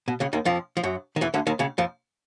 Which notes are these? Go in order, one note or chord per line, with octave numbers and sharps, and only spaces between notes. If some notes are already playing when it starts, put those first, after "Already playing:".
B2
C#2 C#3
D#2 D#3
F2 F3
F3
F#2 F#3
D#3
E2 E3
D2 D3
D#2 D#3
C#2 C#3
F2 F3